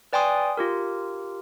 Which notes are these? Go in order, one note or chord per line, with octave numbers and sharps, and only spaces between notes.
B4 D5 G5 G#5 C6 D#6
F4 G4 A#4